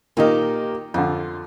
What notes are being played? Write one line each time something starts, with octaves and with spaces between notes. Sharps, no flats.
A#2 D#3 A#3 D#4 G4
F2 D3 F4